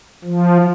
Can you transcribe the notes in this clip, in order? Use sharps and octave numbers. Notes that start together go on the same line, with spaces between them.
F3